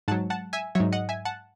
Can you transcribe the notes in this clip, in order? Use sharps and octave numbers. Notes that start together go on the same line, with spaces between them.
G#2 F#3 F#5 A5
F#5 A5
E5 G#5
G#2 F#3 C#5 E5
D#5 F#5
E5 G#5
F#5 A5